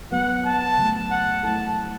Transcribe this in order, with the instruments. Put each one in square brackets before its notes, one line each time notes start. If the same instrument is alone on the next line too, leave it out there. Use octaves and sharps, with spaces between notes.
[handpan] F#3 B3 F#4 B4 [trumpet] F#5
[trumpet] A5
[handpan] C#3 F#3 A3
[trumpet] F#5
[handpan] F#3 A3 E4 A4 [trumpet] A5